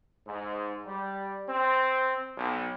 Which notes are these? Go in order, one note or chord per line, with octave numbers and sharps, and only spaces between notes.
G#2
G3
C4
B1